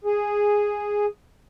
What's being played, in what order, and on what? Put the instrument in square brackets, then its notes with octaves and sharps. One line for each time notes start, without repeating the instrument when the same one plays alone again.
[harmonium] G#4